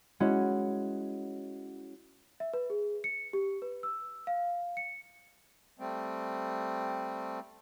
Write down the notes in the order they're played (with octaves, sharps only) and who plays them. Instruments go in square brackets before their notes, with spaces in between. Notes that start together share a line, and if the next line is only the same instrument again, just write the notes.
[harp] G#3 C#4 E4 F#4
[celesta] E5
B4
G#4
C#7
G4
B4
E6
F5
C#7
[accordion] G3 A3 C4